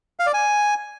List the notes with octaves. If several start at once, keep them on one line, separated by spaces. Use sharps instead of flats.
F5
D5
G#5